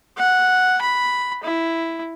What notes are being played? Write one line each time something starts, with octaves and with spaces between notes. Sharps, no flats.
F#5
B5
E4